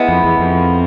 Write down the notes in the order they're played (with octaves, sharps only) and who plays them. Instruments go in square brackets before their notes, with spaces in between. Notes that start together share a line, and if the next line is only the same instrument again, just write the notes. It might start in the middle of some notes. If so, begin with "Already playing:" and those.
Already playing: [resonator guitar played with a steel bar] G#3 B3 E4
[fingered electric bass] F2
E2
F2